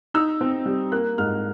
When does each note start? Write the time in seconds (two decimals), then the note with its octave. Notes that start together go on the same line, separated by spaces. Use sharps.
0.14 D#4 E6
0.41 C4
0.66 G3
0.92 A#3 F#6
1.18 G#2 F6